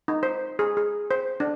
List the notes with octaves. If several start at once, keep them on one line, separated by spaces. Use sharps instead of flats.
D#4
C5
G#4
G#4
C5
D4